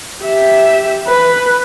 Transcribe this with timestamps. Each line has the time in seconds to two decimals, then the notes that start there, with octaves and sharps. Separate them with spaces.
0.22 G4 E5
1.07 B4